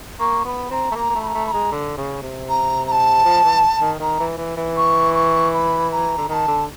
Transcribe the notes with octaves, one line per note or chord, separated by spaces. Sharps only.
A#3 C#6
B3 B5
C4 A#5
A3
A#3 A#5
A#3
A3
B5
A#5
A3
B5
G#3 A#5
D3
C#3
C3
A#5
A#5
A5
F3
E3
D#3
D#3 A#5
E3
E3
E3
C#6
C#6
B5
A#5
D3
D#3 A5 A#5
D3